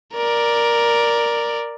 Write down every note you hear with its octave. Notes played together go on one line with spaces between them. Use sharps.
A#4 D5